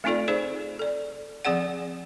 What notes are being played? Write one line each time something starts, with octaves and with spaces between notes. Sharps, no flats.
A3 C4 D#4 F4 A4 D5
D#4 G#4 C5 D5
A4 D5
F3 C4 G#4 D5 F#5